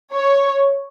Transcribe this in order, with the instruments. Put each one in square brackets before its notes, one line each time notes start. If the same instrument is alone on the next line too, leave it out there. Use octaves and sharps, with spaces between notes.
[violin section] C#5